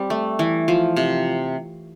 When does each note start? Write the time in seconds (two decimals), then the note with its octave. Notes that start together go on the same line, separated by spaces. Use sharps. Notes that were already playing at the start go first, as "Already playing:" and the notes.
Already playing: G3 C4
0.10 A3
0.39 E3
0.68 F3
0.97 C3